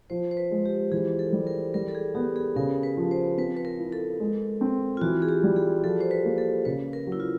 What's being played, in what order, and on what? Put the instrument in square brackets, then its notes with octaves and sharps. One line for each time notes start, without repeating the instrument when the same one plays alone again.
[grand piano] F3 [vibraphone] C5
[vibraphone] C5
B4
[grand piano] G#3
[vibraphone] G4
[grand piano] E3 [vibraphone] G#4
[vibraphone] A4
[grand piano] G3
[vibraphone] A#4
[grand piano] G3 [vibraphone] A#4
[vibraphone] A4
G#4
[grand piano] B3 [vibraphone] G4
[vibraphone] G#4
[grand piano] C#3 [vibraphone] A#4
[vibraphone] B4
[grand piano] F3
[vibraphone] C5
[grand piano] C4 [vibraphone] B4
[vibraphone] B4
A#4
[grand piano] E4
[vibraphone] A4
[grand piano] G#3
C4
[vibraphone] F4
[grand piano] E3 [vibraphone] F#4
[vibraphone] G#4
G4
[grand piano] G3
[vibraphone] G#4
[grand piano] F3 [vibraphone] A4
[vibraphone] C5
B4
[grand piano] A#3
[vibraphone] A4
[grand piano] C#3 [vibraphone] B4
[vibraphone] A#4
[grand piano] F#3
[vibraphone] E4
F4